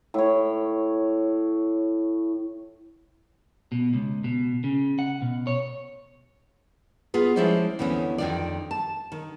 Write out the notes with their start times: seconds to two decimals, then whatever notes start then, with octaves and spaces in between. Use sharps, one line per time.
0.14 A2 C#5
3.72 B2
3.94 C#2
4.24 B2
4.64 C#3
4.99 F#5
5.22 B2
5.47 C#5
7.14 B3 F4 G#4
7.36 F3 G#3 C#4 E4 C5 D5
7.79 D2 E3 B3 C#4
8.18 F2 A2 D#3 F4 D5
8.71 A5
9.12 D#3